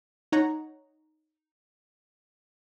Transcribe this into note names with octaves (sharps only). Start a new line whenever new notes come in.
D#4 C#5 F#5 A#5